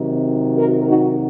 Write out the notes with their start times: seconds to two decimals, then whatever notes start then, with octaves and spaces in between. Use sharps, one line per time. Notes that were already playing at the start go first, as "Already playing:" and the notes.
Already playing: C3 D#3 F#3
0.58 F#4 A#4
0.87 D#4 F#4